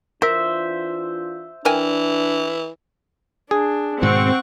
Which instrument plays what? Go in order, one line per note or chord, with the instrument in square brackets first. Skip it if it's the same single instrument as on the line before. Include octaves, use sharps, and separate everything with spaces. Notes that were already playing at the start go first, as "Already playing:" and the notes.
[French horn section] E3 D4 F4 [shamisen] A#4 [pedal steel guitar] C5 E5
[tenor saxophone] E3 [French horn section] D4 [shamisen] A#4 G5 G#5
[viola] D4 [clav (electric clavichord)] G#4
[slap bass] G#2 B2 D#3 [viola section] C4 [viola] F#5 C#6